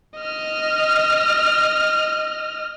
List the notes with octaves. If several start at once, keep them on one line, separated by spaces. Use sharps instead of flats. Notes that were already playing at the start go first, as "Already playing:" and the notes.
D#5 F6